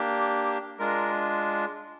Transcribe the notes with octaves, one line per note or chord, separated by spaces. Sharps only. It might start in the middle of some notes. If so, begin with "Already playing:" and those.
Already playing: A#3 D4 G4
G#3 D4 F4 A#4